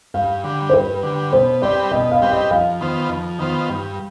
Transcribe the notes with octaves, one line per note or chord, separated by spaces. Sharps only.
G2 F5
D3 G3
C5
G2 B4
D3 G3
B2 C5
G3 C4 G4 B4 D5
B2 D#5
F5
G3 C4 G4 B4
D#5
F2 F5
D#3 B3 F4 C5
F2
D#3 B3 F4 C5
G2